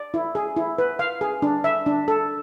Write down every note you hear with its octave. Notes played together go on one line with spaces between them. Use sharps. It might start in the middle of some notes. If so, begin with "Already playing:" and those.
Already playing: D5
E4
G#4
E4
B4
F5
G#4
D4
E5
D4
A4